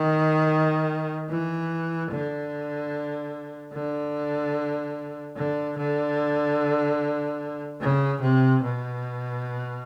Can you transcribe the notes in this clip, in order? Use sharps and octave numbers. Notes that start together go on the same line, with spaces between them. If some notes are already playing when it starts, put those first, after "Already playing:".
Already playing: D#3
E3
D3
D3
D3
D3
C#3
C3
B2